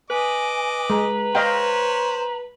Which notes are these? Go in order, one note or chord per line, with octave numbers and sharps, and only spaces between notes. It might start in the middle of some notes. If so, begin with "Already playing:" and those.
B4 D#5 G#5 D6
G#3 A#5
C5 C#5 D#5 F5 G5